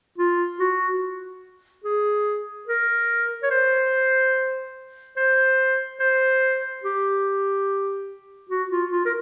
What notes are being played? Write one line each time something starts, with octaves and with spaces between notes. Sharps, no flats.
F4
F#4
G#4
A#4
C#5
C5
C5
C5
G4
F#4
F4
F4
A#4